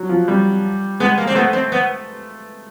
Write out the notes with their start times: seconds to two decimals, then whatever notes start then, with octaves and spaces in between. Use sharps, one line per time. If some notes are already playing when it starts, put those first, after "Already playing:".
Already playing: F#3
0.09 F3
0.28 G3
1.00 G#3 B3
1.18 A#3
1.27 C4
1.35 A3 B3
1.53 C4
1.72 B3